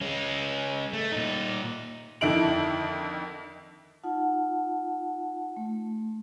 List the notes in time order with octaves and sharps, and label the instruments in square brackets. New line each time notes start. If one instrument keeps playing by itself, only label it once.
[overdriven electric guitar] G#3 C#4
A3
A#2 D#4
[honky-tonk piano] F2 D3 D#3 E4 D7 F#7
[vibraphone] D#4 F4 F#5 A5
A3